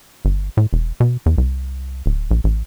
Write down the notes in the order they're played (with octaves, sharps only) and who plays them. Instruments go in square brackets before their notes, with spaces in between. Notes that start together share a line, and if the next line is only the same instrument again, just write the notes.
[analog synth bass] G1
A2
E1
B2
E2
C2
D1
A#1
A1